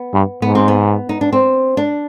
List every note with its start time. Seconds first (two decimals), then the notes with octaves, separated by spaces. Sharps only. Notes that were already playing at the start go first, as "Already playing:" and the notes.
Already playing: B3
0.13 G2
0.42 G#2 B3
0.55 C4
0.68 B3
1.09 D#4
1.21 D4
1.32 C4
1.77 D4